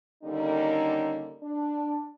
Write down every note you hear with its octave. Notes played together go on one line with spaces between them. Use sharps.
D3 D#3 G3 A#3 C#4 D#4
D4